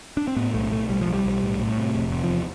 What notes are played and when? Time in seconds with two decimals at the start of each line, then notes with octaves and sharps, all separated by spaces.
0.17 D4
0.27 C4
0.37 A2 B3
0.54 B1 A3
0.71 B1 A3
0.89 B1 G3
1.01 F3
1.07 B1
1.13 G3
1.25 B1
1.42 A2
1.59 A2
1.78 C3
1.95 F1
2.12 C3
2.24 F3
2.30 E2